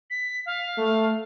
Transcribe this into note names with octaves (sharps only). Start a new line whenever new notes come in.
B6
F5
A3